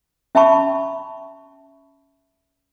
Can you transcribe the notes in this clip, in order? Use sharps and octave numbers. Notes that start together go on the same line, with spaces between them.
C#4 E5 G5 A5 B5 C#6